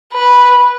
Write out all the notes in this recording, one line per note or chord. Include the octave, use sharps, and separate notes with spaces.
B4